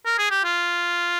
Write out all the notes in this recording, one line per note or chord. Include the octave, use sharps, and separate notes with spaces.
A#4
G#4
G4
F4